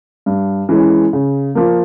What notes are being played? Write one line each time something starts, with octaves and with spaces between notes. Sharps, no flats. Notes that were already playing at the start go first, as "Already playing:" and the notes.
G2
E3 G#3 C#4
C#3
F3 A#3